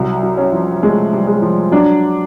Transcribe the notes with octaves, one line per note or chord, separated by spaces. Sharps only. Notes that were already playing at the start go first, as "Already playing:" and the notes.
Already playing: C2 F#3
F#3
C#4
F3
G#3 A3
G3
G#3
F3
F#3 D4